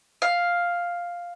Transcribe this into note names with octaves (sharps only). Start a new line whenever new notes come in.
F5